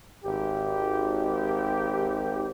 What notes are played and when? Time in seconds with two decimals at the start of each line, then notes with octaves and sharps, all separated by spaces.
0.25 G#1 G4